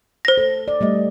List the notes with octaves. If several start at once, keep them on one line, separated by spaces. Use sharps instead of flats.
C5 A#6
A4
D5
G3 A3 D#5